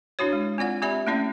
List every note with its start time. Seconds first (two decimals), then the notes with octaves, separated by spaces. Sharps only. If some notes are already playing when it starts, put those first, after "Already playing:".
0.19 D4 E4 F#4 C#5
0.33 G#3
0.58 C4 F4 D5 F#5
0.82 C4 G4 D5 E5 B5
1.07 A3 A#3 C#4 E4 D5